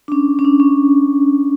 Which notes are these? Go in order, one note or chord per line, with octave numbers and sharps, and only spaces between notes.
D4
C#4
C#4
D4
C#4